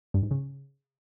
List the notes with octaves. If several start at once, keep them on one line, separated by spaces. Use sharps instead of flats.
G2
G#2
C#3